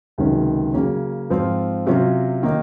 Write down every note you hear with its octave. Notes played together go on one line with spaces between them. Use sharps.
C#2 C3 D#3 F#3 C#4
C#3 F#3 A#3 C#4
G#2 F3 C4 F4
C3 F#3 C#4 F4
D#3 A#3 D#4